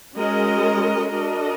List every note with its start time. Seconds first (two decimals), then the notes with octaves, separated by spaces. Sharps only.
0.16 G#3 C#4 F#4 A#4 D#5
1.11 D4 F#4 A#4 D#5